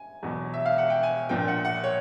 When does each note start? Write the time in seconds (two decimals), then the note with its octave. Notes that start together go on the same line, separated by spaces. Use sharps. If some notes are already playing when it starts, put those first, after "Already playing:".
Already playing: G#5
0.23 E2 B2 F#3
0.54 E5
0.66 F5
0.78 F#5
0.90 G5
1.03 G#5
1.29 A#1 A#2 F3 G5
1.48 F#5
1.65 F#5
1.84 C#5